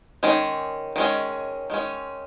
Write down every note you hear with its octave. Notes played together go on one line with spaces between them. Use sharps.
D#3 G#3 C#4
D#3 G#3 C#4
D#3 G#3 C#4